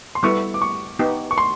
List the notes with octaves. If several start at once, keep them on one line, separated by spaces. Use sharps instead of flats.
C6
G3 B3 E4 A4 C#6
D6
C#6
B3 D#4 G4
C#6
C6